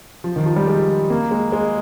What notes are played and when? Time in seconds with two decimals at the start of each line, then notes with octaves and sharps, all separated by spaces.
0.24 F3
0.36 D#3
0.46 F3
0.56 G3
0.68 G#3
1.10 A#3
1.31 G#3
1.52 G#3